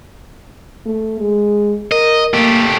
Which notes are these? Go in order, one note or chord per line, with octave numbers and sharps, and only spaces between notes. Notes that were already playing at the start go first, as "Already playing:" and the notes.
A3
G#3
A#4 D#5
A3 A#3 G4